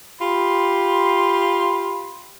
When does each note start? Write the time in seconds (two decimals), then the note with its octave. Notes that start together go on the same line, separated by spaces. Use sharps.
0.21 F4 G4 B5 C6